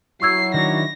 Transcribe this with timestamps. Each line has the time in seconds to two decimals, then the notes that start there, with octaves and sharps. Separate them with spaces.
0.22 F#3 E4 C#6 E6 G#6 C7
0.54 D#3 D4 C#5 A#6